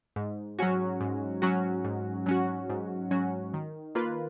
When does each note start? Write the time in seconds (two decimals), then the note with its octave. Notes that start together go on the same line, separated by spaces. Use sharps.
0.16 G#2
0.59 F#3 C#4 F#4
1.01 G#2
1.42 F#3 C#4 F#4
1.84 G#2
2.26 F#3 C#4 F#4
2.69 G#2
3.11 F#3 C#4 F#4
3.54 D#3
3.95 A#3 F4 B4